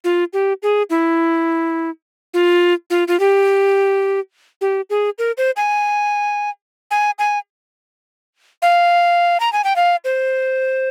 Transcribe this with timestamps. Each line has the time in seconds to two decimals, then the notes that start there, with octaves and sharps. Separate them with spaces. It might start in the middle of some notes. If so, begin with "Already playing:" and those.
0.04 F4
0.33 G4
0.63 G#4
0.90 E4
2.34 F4
2.90 F4
3.08 F4
3.20 G4
4.61 G4
4.90 G#4
5.18 A#4
5.37 C5
5.56 G#5
6.91 G#5
7.19 G#5
8.62 F5
9.40 A#5
9.53 G#5
9.64 G5
9.76 F5
10.05 C5